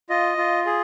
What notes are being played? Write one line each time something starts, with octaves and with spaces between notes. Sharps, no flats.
F4 D#5
F4
G#4